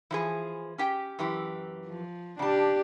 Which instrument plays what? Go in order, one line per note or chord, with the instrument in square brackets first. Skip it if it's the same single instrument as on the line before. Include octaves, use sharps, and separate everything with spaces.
[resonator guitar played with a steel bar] E3 F3 G#4
C#4 G4 G5
F#2 E3 G4
[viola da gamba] F3
[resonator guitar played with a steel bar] C#3 A5 [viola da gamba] D4 G4